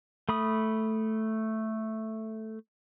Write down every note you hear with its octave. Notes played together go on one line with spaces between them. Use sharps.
A3 B5 D#6